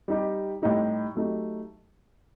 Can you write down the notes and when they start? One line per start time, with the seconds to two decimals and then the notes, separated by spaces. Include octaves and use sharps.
0.08 G3 D#4 G4
0.62 A2 G3 D#4 G4
1.15 F#3 A3 D#4 G4